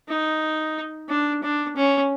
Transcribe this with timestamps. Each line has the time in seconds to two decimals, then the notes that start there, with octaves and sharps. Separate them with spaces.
0.09 D#4
1.09 D4
1.43 D4
1.76 C#4